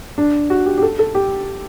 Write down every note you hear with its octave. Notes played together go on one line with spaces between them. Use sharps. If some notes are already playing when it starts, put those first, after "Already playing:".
D4
F#4
G4
G4
A4
A4
G4